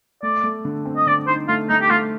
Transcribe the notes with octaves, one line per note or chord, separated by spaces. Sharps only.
A3 D5
A3
D3
C4
D#5
D3 D5
D#4 C5
A3 F4
A3 D#4
G4
A3 F4